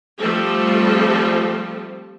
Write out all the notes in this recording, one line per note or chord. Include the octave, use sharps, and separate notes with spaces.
F3 G3 A3 C4 G4 A4